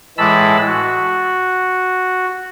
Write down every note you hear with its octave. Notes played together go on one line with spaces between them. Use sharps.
A2 E3 G#3 A5 B5 E6
F#4